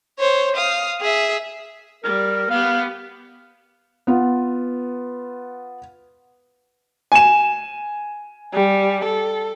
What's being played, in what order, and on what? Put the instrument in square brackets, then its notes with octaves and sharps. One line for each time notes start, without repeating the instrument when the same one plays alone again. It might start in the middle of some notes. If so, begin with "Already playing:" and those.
[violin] C5 C#5
F5 D#6
G#4 E5
[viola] G3 [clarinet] A#4
[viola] B3 G4 [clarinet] F5
[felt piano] B3 F4
[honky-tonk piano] G#5 E7
[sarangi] G3
A4